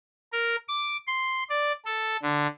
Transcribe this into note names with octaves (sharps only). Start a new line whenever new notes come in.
A#4
D6
C6
D5
A4
D3